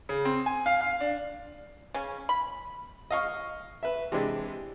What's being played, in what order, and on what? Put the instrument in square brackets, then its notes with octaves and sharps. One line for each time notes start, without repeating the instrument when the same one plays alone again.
[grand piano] C#3
C4
G#5
F5
F5
D4
[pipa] C#3 C#4
B5
[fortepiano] D#5 F5 C#6
B4 E5
C3 E3 G#3 D4